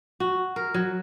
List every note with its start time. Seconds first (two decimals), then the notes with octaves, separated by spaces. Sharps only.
0.20 F#4
0.56 A#4
0.74 F#3